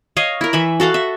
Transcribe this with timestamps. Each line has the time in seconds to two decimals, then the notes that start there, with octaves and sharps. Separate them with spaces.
0.17 C#5 D#5 F5
0.41 E4 A#4
0.53 E3 E5 B5
0.80 F#4 A4 F5 F#5
0.94 E5